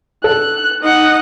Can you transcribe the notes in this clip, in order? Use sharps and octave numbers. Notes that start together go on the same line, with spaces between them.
A4 F#6
D#4 D#5 F#5